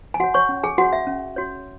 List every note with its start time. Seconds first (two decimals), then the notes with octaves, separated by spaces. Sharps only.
0.14 G#5
0.20 F#4 F#5
0.24 C#5
0.34 C#5 C#6
0.49 C#4
0.63 G#4 G#5
0.78 F#4 F#5
0.81 C#5
0.93 E5
1.07 C#4
1.36 F#4 C#5